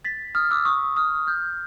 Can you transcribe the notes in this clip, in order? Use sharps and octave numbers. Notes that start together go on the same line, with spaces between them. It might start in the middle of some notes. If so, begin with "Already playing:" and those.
A6 B6
D#6 F6
D6 E6
C#6 D#6
D#6 F6
F6 G6